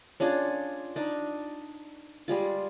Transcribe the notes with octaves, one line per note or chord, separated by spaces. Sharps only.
C#4 D4 F4 G#4
D4 D#4
G3 G#3 F4